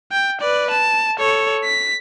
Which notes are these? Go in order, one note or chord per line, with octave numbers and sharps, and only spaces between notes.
G5
B4 D5
A5
A4 C#5
B6